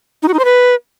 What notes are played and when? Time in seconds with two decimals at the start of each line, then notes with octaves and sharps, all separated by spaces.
0.23 D#4
0.28 F#4
0.34 D#4
0.39 C5
0.45 B4